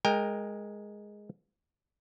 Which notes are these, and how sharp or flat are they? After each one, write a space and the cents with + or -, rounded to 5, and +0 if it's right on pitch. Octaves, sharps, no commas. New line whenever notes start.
G#3 +0 A#4 +0 G5 +30